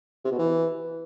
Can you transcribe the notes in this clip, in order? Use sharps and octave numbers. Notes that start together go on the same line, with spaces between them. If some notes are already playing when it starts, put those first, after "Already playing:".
C3
B2
E3